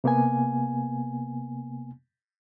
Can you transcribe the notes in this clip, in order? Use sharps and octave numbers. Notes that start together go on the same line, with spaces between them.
C3 A#3 B3 G#5